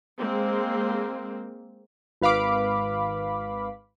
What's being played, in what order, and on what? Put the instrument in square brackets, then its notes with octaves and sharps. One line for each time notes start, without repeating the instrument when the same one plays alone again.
[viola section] G#3 A#3 C4
[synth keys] G#1 B4 F5 B5 D6